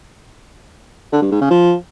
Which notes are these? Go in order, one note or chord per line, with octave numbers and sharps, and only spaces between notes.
D3
G2
G#2
C#3
F3